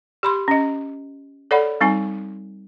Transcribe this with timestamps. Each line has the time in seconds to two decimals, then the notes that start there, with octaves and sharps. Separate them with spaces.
0.23 G4 B5 C6
0.48 C#4 D#5
1.51 A4 C#5 D5 F#5 B5
1.81 G3 C4 D#4 G#5